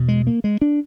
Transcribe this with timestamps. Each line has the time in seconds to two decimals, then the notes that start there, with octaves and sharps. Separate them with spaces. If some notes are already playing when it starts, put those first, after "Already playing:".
Already playing: E2 B2
0.08 G#3
0.27 A#3
0.44 G#3
0.62 D4